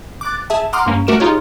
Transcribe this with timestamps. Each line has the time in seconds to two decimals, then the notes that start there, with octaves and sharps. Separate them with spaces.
0.21 D6 F#6 A6
0.50 G#4 E5 A5
0.73 F#5 A#5 C6 D6 D#6 F6
0.86 G2 A#3 C#4
1.07 A3 F#4 A#4 D6 D7 E7
1.20 D#4 F4 G4 G#4 C#5